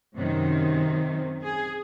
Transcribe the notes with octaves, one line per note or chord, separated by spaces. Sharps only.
F#2 C3 D#3 C4
G#4